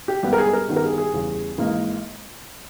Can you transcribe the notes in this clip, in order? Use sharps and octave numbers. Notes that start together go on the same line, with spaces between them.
G4
G#1 G2 G3 B3 G4
A#4
G#4
A#4
G2 D#3 G3 B3
A#4
G#4
G#4
E2 C#3 G3
G#1 G#2 E3 A#3